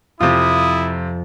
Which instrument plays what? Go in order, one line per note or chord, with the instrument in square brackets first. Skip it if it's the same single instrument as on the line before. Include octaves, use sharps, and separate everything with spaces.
[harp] F2 [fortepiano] C3 F4 [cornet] E4 [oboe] D#6